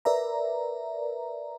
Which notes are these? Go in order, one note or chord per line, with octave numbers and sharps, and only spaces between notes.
A#4 B4 D5 E5 A#5